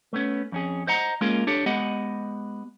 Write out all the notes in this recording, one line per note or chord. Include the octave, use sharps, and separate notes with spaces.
A3 B3 C#4
F2 C#4 G#4
C5 D#5 F#5 A#5
G#3 A#3 C#4 F4 G#4 A#4
D4 G4 A4 C#5
G#3 B3 G4 D#5 F#5